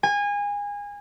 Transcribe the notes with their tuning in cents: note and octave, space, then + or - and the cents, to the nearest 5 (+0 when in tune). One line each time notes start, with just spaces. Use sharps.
G#5 -25